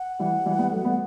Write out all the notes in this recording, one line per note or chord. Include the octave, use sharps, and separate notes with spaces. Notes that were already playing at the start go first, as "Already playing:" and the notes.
Already playing: F#5
E3 G3
E3 G3
G3 B3
F#3 A3
G3 B3